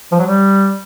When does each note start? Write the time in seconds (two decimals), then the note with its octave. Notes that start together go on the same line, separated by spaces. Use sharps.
0.12 F3
0.19 F#3
0.26 G3